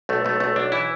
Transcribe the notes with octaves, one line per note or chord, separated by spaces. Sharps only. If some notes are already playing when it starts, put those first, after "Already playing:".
B1 A3
B1 A3
B1 A3
B1 D4
E3 E4